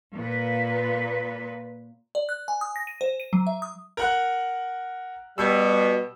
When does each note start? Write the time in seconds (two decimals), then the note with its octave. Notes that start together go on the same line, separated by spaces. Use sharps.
0.14 A#2 B4
2.15 D5
2.29 F#6
2.48 G#5
2.61 D#6
2.76 A#6
2.87 D#7
3.01 C5
3.20 D#7
3.33 F#3
3.47 E5
3.62 D#6
3.97 A#4 F#5 F#6
5.38 B2 G3 E6